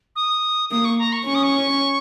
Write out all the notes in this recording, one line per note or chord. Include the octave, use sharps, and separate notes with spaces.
D#6
A#3 D#6
C#6
A#5
C#6
C#4 C#6
D#6
C#6